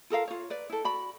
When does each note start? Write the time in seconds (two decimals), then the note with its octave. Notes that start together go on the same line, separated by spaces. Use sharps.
0.10 F4 A4 A#4 F5
0.28 F4 C#5
0.50 B4 D5
0.70 E4 A4
0.84 F#4 D5 B5